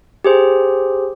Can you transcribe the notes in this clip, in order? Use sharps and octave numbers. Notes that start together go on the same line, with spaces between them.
G4 G#4 C5